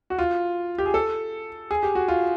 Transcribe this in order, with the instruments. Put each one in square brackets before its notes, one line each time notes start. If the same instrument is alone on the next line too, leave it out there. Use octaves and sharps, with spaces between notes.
[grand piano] F#4
F4
G4
G#4
A4
G#4
G4
F#4
F4